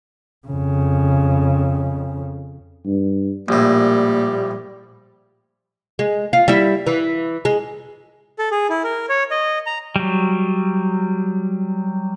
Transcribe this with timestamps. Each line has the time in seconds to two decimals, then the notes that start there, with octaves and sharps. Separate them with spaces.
0.47 F2 C#3
2.86 G2
3.48 A#1 A2 G3 A#3
5.99 G#3
6.33 F4
6.48 G3 E4
6.87 E3
7.45 G#3
8.39 A4
8.51 G#4
8.70 E4
8.84 A#4
9.09 C#5
9.31 D#5
9.66 A#5
9.96 F#3 G3